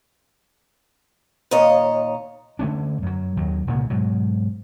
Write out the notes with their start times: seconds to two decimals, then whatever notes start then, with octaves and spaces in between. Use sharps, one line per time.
1.51 D#2 A#2 C#5 D#5
2.59 D3 A3 C#4 D4
3.02 F#2 F#3
3.36 D#2 D#3 F#3
3.67 C2 A#2 C#3
3.90 G#2 B2 F#3